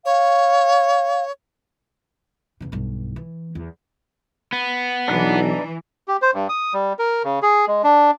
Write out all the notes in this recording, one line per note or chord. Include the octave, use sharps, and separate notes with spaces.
C#5 F5
E2 C#3
B1 G2
E3
E2
B3
B1 E3 D4 D#4 F#6
G4
C5
G2
D#6
G3
A#4
C#3
G#4
G#3
D4